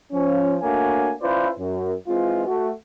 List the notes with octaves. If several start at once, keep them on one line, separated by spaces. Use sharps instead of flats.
F3 C#4
A3 A#3 D4 F#4 C#5 G#5
C#4 E4 F4 B4 C5 D5
F#2
E3 G#3 C4 F4
A3 F#4